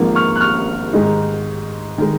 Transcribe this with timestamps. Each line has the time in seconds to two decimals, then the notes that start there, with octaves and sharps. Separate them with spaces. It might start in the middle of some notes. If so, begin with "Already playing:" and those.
Already playing: G#1 G#2 F3 A#3
0.15 C#6 F6
0.36 F#6
0.41 C#6 F6
0.93 G#2 D#3 G#3 D#4
1.98 D#3 G#3